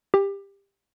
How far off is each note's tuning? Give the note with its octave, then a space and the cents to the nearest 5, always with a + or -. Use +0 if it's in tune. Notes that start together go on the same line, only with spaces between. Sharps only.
G4 +20